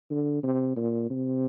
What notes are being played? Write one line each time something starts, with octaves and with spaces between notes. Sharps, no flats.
D3
C3
A#2
C3